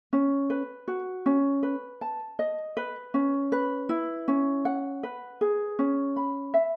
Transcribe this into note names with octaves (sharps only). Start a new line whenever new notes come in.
C#4
B4
F#4
C#4
B4
A5
D#5
B4
C#4
B4
E4
C#4
F#5
B4
G#4
C#4
B5
E5